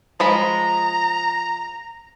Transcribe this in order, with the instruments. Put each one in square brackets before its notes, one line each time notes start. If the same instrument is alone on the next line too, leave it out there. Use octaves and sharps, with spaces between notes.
[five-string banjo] F3 G#3 B5 [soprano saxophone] A#5